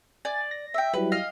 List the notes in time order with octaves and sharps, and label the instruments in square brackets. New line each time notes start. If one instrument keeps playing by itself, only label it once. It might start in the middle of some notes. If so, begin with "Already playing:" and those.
[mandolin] D5 [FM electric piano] G#5 A6
[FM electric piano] A#6
[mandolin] E5 G5
[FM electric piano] F#3 G3 E4 [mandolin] B4
[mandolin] D#5 F5 F6